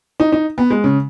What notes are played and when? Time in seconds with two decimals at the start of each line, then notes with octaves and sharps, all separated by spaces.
0.20 D#4
0.32 D#4
0.58 B3
0.70 G#3
0.84 C#3